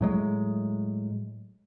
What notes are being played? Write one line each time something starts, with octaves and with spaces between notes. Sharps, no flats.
A2 F#3 G#3